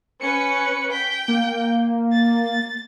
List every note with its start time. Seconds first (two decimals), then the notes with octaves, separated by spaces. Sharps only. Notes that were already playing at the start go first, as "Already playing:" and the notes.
0.21 C#4 B4 C#7
0.91 G5 B6
1.28 A#3
2.13 A6